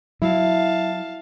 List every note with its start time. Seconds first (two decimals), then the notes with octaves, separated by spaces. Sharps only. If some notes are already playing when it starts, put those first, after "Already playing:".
0.22 F#3 E4 F5 A5